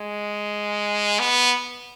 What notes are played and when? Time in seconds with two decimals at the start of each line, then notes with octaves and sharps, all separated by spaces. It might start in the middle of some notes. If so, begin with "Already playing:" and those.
Already playing: G#3
1.19 B3